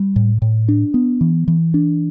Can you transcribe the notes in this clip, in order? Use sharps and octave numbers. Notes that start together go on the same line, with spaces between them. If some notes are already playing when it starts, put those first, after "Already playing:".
Already playing: G3
A2
A2
D4
B3
E3
E3
D4